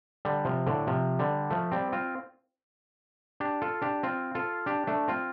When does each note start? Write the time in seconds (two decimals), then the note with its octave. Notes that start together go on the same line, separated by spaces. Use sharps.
0.25 D3 G3
0.45 C3 F3
0.67 A2 D3
0.87 C3 F3
1.19 D3 G3
1.50 F3 A3
1.71 G3 C4
1.92 C4 F4
3.40 D4 G4
3.62 F4 A4
3.82 D4 G4
4.03 C4 F4
4.35 F4 A4
4.66 D4 G4
4.87 A3 D4
5.08 C4 F4